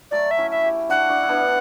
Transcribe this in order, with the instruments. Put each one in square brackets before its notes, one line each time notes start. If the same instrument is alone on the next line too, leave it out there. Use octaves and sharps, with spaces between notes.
[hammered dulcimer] F#3 A3 [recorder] D5
[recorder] E5
[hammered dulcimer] C#4 E4
[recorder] E5
[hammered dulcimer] E4 G4
[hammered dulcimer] D4 F#4 [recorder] F#5
[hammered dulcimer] D4 F#4
E4
B3 D4